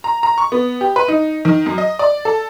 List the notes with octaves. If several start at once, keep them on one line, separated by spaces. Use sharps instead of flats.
A#5
A#5
C#6
B3
G4
B4
D#4
D#3
F#2
D#5
D5
A4